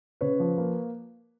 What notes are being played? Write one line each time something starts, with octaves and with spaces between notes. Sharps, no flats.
C#3 B4 C#5
F3
A#3